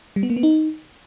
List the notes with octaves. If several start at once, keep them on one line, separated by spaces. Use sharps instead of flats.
G3
B3
A#3
B3
D#4